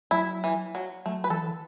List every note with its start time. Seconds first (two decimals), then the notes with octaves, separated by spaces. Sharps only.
0.11 F#3 E4
0.44 E3
0.75 F#3
1.06 F#3 A3
1.24 B4
1.30 E3 A4